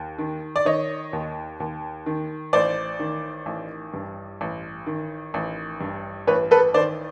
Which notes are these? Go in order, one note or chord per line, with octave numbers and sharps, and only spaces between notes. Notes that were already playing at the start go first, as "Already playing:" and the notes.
Already playing: D#2
D#3
D5
D#3 C#5 D#5
D#2
D#2
D#3
A1 C5 D5
D#3
A1
G2
A1
D#3
A1
G2
A1 B4 C#5
A4 B4
D#3 C5 D5